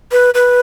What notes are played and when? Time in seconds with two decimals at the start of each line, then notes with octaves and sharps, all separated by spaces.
0.12 B4
0.34 B4